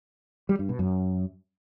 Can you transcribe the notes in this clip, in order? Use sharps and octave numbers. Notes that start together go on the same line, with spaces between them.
G3
G2
B2
F#2